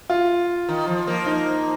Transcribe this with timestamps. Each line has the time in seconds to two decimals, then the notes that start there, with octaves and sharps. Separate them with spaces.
0.10 F4
0.69 D#3
0.87 F3
1.07 F3 A#3
1.26 D#4